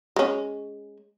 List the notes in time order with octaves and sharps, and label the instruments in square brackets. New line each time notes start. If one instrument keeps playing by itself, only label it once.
[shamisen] G#3 C#4